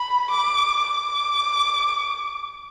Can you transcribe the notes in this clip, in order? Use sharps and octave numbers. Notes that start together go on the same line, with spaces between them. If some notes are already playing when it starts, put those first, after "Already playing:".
Already playing: B5
D6
D6